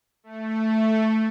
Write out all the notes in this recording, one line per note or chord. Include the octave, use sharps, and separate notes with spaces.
A3